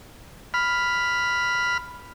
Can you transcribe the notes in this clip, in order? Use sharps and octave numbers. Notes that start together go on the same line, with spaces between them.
B5 F6